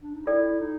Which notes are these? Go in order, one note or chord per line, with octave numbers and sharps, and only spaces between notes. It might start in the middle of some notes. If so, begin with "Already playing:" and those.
D4
D#4
E4 F4 A4 D5 G5
D#4